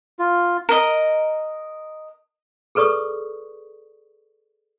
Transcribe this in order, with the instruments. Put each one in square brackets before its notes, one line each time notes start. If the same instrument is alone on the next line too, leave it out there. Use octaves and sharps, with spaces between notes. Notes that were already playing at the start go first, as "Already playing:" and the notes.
[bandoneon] F4
[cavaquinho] A#4 D#5
[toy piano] G#4 A4 B4 D5 C#6 D#6